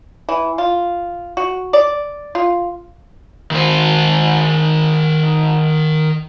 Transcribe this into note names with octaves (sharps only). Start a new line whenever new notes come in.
E3
F4
F#4
D5
F4
D#3 C5